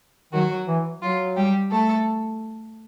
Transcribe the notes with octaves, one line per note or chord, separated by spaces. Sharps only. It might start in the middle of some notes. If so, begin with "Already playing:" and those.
D#3 F#3 F#4
E3
F#3 F4
G3 G4
A3 A4